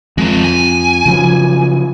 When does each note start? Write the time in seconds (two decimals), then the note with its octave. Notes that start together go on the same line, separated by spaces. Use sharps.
0.18 F2 G#3 A#4
0.44 G#5
1.06 C#3 F3 F#3